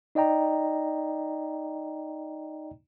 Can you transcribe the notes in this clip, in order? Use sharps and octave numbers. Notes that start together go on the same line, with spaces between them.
D#4 D5 D#5 G5 A#5